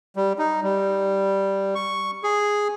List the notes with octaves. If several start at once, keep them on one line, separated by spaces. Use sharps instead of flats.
G3
D#4
G3
C#6
G#4